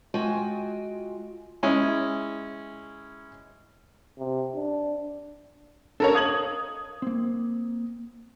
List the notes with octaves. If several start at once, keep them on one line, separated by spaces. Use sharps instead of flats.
G#3 F4 F#4 G5 G#5
G#3 C#4 E4
C3
D4
C#4 D4 A4 A#4 C#5
D#5 F5 D#6 G#6 F#7
A#3 C4